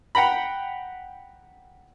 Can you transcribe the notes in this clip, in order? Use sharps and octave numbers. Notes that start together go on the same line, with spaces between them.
F#5 G5 A#5 B5